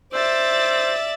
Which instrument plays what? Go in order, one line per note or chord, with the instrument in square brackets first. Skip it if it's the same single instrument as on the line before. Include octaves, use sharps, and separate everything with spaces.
[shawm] C5 [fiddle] D5 E5 [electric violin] E6 A6